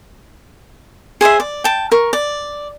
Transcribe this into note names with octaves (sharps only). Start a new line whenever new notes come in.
G#4 C5 D#5 E5
D5
G5 A5
A#4 C#6
D5